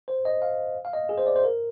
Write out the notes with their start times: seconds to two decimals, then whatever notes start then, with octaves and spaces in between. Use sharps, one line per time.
0.08 C5
0.25 D#5
0.42 F5
0.85 F5
0.93 D#5
1.09 G#4
1.18 C5
1.26 D5
1.36 C5
1.44 A#4